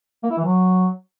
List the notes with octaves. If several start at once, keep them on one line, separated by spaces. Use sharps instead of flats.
A#3
E4
E3
F#3